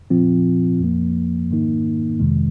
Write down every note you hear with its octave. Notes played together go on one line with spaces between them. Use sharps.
A#2 F3 C4 F4
F2 F3 A#3
G#2 D#3 A#3 D#4
F2 C3 D#3 G#3